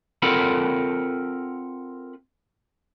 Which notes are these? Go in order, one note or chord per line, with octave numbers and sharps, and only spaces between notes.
C4 F4 A4 A#4 F#5 B5